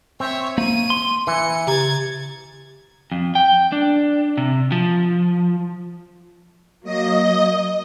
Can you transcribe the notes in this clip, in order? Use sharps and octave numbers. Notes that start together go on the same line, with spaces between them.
C4 C#5 E5
A#3 D#7
C6
E3 C#7
C#3 G4 A#5 G#6 A6
F2
G5
D4
C3
F3
F#3 A#3 D#5